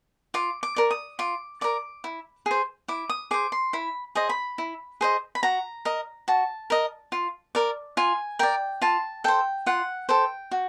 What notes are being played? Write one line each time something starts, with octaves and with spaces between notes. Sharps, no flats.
F4 D6
D6
A#4 D5
D#6
F4 D6
A#4 D5 D6
E4
G#4 C5
E4 D6
D#6
G#4 C5 D6
C6
E4 B5
G#4 C5 D#5
B5
E4
G#4 C5 D#5
B5
F#4 A#5
A#4 D#5
F#4 A5
A#4 D#5
F4
A#4 D5
F4 G#5
A#4 D5 G5
F4 A5
A4 C5 G5
F4 F#5
A4 C5 G5
F#4